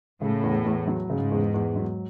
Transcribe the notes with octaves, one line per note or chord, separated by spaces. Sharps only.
A2 C#3
E2
E2
F#3
G#2 C#3
E2
E2
F#3